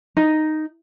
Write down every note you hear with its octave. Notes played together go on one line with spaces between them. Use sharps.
D#4